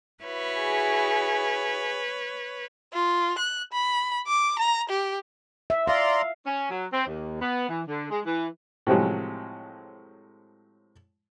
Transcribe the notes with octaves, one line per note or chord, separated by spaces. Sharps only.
E4 F#4 B4 C#5
G#4
F4
F#6
B5
D6
A#5
G4
E5
D5 E5 F5 A#5 C6
C#4
F#3
C4
D#2
B3
E3
D3
G#3
E3
A2 C3 F3 F#3 G#3